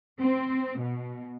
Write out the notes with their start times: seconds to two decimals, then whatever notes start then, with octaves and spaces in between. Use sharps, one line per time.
0.21 C4
0.82 B2